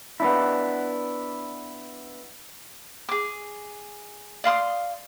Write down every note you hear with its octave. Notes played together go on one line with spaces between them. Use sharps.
B3 D4 E4
G#4 D6
D5 F5 C6 D#6